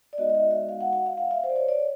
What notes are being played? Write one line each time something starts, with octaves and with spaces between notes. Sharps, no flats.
D5
G#3 B3 D#4 F#4 D#5
D#5
E5
E5
F5
F#5
F#5
F5
F5
E5
C5
D5
C#5
D5